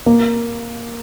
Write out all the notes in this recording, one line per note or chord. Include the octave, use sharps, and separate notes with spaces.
A#3